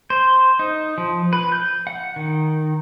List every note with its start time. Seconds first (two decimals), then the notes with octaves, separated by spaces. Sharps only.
0.10 C5
0.59 D#4
0.98 F3
1.33 B4
1.52 G6
1.87 F#5
2.16 D#3